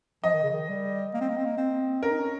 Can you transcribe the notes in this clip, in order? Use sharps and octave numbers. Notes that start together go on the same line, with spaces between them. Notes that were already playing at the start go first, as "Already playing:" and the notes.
F3 D#5
D#3
C#3
D#3
G3
A#3
C4
A#3
C4
A#3
C4
C#4 A#4
D#4
C#4